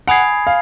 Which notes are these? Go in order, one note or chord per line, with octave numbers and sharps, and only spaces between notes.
F#5 G#5 B5 D#6 G#6 C7
F5